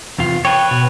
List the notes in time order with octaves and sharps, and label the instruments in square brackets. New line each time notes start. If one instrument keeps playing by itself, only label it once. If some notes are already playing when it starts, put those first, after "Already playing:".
[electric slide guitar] E2 C3 F4
[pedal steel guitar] B4 C#5 [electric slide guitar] G5
[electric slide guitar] B2